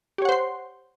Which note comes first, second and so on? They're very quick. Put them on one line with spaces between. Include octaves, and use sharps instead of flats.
G4 C#5 F#5 C5 C6